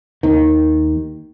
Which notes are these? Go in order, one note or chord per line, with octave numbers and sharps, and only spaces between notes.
D#2 D#3